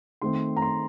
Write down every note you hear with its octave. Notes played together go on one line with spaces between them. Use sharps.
D#3 A3 C4 C6
A#5
C6